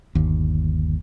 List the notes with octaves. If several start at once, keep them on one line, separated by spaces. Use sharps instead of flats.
G1 D#2